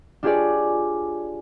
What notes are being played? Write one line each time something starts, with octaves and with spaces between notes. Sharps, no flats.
D4 F4 G4 G#4 C#5 D5